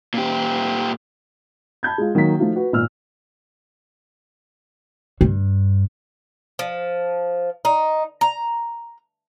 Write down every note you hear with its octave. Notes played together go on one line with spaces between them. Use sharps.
A#2 G4
A5 B5 G6 G#6
G#3 F4
D#3 F#3 A#3 B6
F3 A3 D#4 F4 F#4
F#4 B4
G#1 A#2 E6 F6
G2
F3
D#4
A#5